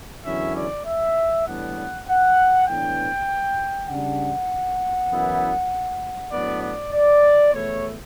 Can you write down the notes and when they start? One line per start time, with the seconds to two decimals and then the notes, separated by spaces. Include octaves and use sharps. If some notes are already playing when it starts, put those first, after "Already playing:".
0.24 E2 D3 F#3 C#4 E4 E5
0.55 D5
0.85 E5
1.46 A2 E3 G3 B3 D4 F#5
2.07 F#5
2.67 A2 E3 B3 D4 G5
3.89 C#3 G3 D4 F#5
5.10 F#2 E3 B3 E4
6.31 A2 F#3 B3 D4 D5
6.62 D5
6.93 D5
7.53 E2 B2 A3 E4 C#5